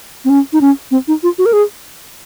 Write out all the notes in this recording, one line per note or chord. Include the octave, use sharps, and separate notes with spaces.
C4
C#4
D#4
C#4
C4
D#4
F4
F#4
A#4
G#4